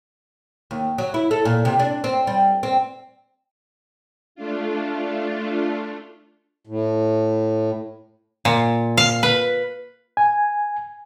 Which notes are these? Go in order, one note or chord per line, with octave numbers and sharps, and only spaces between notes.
D#2
F#3
E4
A4
A#2
C3
D4
C4
G3
C4
A3 D4 F4
A2
A#2
F5
B4
G#5